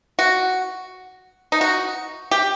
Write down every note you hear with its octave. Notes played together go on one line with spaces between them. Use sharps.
F#4
D#4
F#4
G4